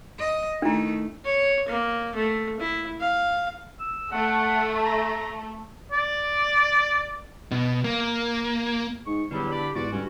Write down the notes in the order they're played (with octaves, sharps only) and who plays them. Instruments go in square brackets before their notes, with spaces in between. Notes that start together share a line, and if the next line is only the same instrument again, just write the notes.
[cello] D#5
[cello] D#3 A3 [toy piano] D4 E4
[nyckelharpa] C#5
A#3
A3
E4
F5
[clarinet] E6
[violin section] A3 [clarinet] F#5
[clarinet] A#5
[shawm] D5
[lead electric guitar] B2
A#3
[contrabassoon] G#2 [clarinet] C#6
[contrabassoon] E2 [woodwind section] A2 F#3 G3 [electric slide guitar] D3 [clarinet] G4
[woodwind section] D4 D5 B5
[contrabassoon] E2 [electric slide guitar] G#2 [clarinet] F#4 [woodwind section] D5
[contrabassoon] G2 [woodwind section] D3 G3 C#4